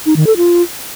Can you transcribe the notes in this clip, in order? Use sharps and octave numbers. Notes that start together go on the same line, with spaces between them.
D#4
D#3
A4
F4